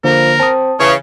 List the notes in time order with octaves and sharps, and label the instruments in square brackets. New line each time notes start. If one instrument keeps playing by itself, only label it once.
[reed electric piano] D3 A#3 [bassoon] F3 [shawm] A#4
[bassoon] C4 [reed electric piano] A5 D#6
[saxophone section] C#3 [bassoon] E3 [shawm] C#5